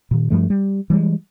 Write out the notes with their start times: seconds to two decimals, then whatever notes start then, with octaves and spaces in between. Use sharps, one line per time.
0.11 A#2 D#3
0.30 G2 F3 G3 A3
0.50 G3
0.90 E3 G3 G#3